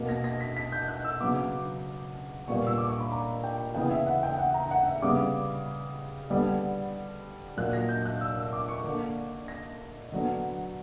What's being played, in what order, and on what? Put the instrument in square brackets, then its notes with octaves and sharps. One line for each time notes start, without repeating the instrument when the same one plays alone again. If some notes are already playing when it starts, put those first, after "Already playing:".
Already playing: [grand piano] B2 A#3
A#6
A#6
B6
B6
G6
F#6
E6
C#3 F#3 B3 D6
A#2 G3 B3 C#6
E6
D6
C#6
B5
A#5
G5
C#3 E3 B3 G5
E5
F#5
G5
F#5
A#5
F#5
E5
C#3 G3 B3 D6
D3 G3 B3
A#2 F#3 A#3 F#6
A#6
G6
F#6
E6
E6
D6
C#6
D3 A#3
A#6
D3 F#3 B3